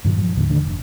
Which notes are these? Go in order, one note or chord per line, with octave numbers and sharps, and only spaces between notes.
G2 A#2 D#3 F#3
F3
D#2 A2 D3
D3 D#3 A3 D4
F1